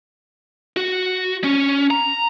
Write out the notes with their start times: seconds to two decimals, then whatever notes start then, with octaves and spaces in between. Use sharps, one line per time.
0.77 F#4
1.44 C#4
1.91 A#5